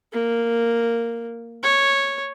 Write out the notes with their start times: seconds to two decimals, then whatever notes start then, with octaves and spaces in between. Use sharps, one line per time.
0.13 A#3
1.63 C#5